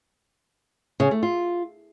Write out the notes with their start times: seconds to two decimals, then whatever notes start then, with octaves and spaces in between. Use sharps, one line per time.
1.00 C#3
1.11 A3
1.23 F4